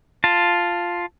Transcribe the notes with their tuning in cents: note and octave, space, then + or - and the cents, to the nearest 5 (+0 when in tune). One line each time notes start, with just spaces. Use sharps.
F4 +0 A5 +0